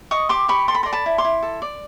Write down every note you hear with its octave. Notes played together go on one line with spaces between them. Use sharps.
D#5 C#6 D#6
G4 C6 D6
G4 B5 C#6
A4 C6
B5
D5 A#5 C6
A5 B5
E4
C6 D6
E4
A4
D5